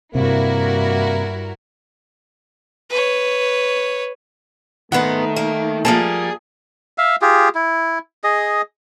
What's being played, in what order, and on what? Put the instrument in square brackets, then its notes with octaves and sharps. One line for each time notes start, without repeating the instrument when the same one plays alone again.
[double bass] G2 [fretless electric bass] C3 [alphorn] A#3 [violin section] E4 F#4 A#4
[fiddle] B4 C#5
[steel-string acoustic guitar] G#2 G#3 B3 [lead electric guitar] D#3 [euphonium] A3 [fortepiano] F#5
[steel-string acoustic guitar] A#3
[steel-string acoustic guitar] F3 G3 A#3 [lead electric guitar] G#4 [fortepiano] A5
[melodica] E5 F5
F4 G4 G#4
E4
G#4 D#5